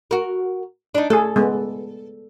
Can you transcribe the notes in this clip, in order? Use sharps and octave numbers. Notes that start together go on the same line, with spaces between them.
F#4 A#4
D4 D#4
A3 G#4 A4
G#3 B3